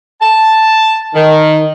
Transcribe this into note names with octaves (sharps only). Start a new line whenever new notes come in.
A5
D#3